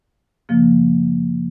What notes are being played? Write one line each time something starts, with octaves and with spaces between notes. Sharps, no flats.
F#2 C#3 F3 A#3